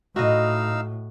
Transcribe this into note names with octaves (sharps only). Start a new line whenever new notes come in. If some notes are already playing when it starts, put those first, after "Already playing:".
A2 D#4 F#4 D#5 F5 E6